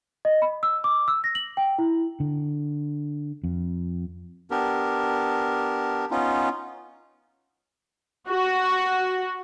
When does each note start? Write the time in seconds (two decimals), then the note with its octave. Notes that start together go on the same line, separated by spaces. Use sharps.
0.25 D#5
0.42 B5
0.63 E6
0.84 D6
1.08 E6
1.24 A#6
1.35 F#7
1.57 G5
1.79 E4
2.20 D3
3.44 F2
4.51 B3 D4 G4 A#4
6.11 B3 C#4 D#4 F4
8.29 F#4